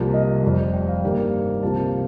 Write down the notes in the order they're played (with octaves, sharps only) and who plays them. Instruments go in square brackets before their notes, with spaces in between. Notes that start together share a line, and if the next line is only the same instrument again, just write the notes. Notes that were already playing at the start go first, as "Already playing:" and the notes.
Already playing: [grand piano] C2 C3 F3 A#3
D#5
F1 F2 C3 G3
G5
F5
G2 D#3 G3 A#3
C2 C3 F3 A#3 A5
F5